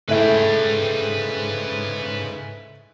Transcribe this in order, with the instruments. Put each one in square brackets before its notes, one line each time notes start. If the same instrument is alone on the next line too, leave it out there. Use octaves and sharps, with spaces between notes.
[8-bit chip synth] G#2 C#3 [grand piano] A3 E4 [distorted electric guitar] B4 G5